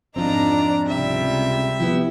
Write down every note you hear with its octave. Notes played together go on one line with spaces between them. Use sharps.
F2 G#2 F3 C4 D4 D#4 D5 A#5
C#2 C3 G3 E5
F3 B3 E4 G4